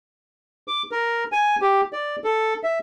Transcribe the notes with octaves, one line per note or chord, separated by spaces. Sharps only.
D6
A#4
G#5
G4
D5
A4
E5